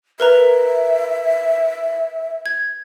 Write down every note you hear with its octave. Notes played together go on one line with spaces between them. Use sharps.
A#4 B4 E5 A#5
G#6